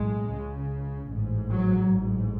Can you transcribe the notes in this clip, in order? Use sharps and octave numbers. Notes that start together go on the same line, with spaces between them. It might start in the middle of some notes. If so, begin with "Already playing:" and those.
Already playing: B1 A2 G#3
C#2 C#3
A1 G#2
F#3
A1 G#2